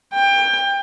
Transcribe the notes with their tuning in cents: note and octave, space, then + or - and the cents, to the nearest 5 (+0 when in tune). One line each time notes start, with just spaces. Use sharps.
G5 +25